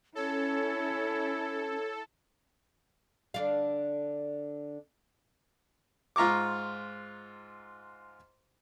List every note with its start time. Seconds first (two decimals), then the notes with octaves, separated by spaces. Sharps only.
0.15 C#4 E4 A4 C#5
3.34 D3 D4 F5
6.16 G#2 F4 A#5 C#6 D6